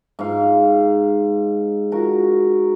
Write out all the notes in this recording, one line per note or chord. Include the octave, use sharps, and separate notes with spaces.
G#2 F5
F#4 A#4